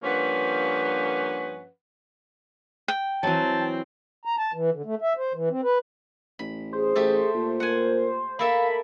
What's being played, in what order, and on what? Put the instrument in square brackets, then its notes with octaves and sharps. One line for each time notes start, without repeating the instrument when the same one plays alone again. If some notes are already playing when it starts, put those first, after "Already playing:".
[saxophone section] G2 F3 A#3 C#4 B4 F#5
[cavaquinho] G5
[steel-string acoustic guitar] E3 F#3 [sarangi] C4 [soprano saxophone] A5
[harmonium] A#5
A5
E3
D3
A3
E5
C5
E3
C4
B4
[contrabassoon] A1 [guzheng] B5
[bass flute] G#4 [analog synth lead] C5
[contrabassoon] A1 [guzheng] A3 G4 A4
[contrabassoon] A#2
[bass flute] A#4 [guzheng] F#5 G#5
[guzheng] A#3 A4 E5 [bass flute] F5 [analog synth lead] B5